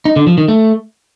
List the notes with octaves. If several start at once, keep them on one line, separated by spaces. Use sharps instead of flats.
D#4
D3
F3
D#3
A3